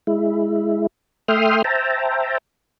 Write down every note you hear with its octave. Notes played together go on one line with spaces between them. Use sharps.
G#3 E4
A3 E5 G5 C6 D#6 F6
C5 E5 G5 A5 A#5